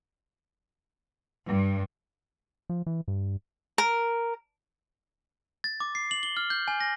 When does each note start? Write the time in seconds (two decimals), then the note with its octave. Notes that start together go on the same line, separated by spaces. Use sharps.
1.47 G2
2.70 F3
2.87 E3
3.08 G2
3.78 A#4
5.64 A6
5.80 D6
5.95 C7
6.11 F#7
6.23 G7
6.37 F6
6.50 G6
6.68 G#5
6.81 A#6